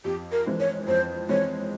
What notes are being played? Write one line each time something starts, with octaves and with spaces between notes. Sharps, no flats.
F2 G4
A#4
E3 G#3 C4
C#5
F2 C5
E3 G#3 C4 C#5